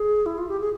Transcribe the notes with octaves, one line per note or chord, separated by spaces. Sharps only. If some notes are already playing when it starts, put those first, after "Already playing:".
Already playing: G#4
E4
F4
G4
G#4